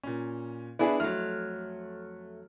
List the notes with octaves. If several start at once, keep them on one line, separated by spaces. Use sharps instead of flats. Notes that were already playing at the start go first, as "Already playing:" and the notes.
A#2 C#4
B3 D4 E4 G#4
F2 F#3 A3 F6